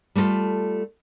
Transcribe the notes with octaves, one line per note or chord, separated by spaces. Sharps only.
G3 A3 B3 F4 A4